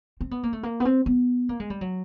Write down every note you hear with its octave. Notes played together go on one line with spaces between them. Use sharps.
C4
B3
A#3
A3
A#3
B3
C4
B3
A#3
G#3
G3
F#3